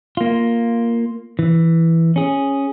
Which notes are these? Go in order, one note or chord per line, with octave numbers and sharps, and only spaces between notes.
A#3 F4
E3
C#4 G#4